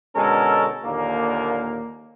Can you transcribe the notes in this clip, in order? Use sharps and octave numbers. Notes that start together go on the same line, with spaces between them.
B2 D3 G#3 C#4 A4 A#4
D#2 A#2 D3 A#3